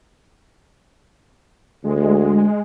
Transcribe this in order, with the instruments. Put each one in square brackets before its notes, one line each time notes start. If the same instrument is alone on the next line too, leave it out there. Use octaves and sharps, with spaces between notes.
[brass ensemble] D2 [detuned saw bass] G#3